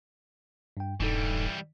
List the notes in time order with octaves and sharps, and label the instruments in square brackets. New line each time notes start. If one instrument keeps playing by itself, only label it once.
[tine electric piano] G2 G5
[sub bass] D#1 [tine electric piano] G2 D#4 A4 [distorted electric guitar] E3 G3